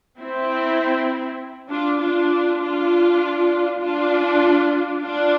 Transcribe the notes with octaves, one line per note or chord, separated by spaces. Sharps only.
C4 E4
D4 F4
D4 F4
D4 F4
D4 F4
D4 F4